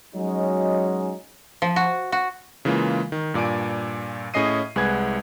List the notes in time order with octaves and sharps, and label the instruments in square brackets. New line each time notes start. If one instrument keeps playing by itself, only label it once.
[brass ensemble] F#3 G#3 C#4 D#4 F#4 C#5
[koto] F3
F#4
F#4
[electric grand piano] C#3 E3 G#3 A#3 F4
D#3
G2 A#2 D5 G#5 D7
A2 C#4 G#4 D#5 C7 D#7
C2 G#3 G#4 B4 F#5 G#6